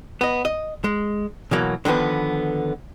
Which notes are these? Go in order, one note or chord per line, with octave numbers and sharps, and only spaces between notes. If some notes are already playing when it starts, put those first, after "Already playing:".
B3 D#5
D#5
G#3
B2 E3 F#3 A#3
D3 D#3 F3 B3 B4